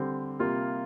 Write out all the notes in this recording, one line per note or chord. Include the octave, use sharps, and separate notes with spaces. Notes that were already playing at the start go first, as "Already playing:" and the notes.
Already playing: D3 G3 C4
C3 G3 A#3 F4